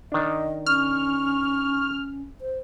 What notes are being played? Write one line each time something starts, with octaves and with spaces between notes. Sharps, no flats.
D#3 D4 D#5
C#4 C#6 F6
C5